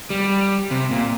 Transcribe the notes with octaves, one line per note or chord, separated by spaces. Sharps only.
G3
C3
A#2